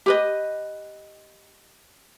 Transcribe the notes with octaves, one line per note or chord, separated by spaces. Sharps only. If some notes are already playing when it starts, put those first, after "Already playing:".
G4 B4 D#5